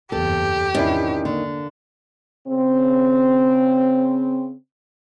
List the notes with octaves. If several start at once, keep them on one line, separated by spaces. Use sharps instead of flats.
F#1 E2 G2 G4 A4
E2 G#2 C3 D#3 C#4 D4 E4
D3 A#3
C#3 C4